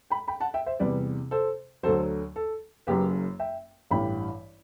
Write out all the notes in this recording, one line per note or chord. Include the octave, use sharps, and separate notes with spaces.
G5 B5
G5 B5
F#5 A5
E5 G5
C5 E5
E2 C3 G3 B4 D5
A4 C5
D2 D3 F#3 A4 C5
A4
F#1 F#2 F#3 G4 B4
E5 G5
A1 G2 E3 G3 G5 B5